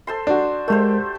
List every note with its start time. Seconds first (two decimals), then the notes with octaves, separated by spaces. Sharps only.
0.07 A4 C5 C6
0.27 D4 F#4
0.68 G#3 A3 G4 A#4 C5